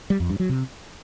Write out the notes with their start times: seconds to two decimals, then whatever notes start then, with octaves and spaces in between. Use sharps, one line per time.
0.10 G3
0.20 F2
0.30 G2
0.40 F#3
0.49 C3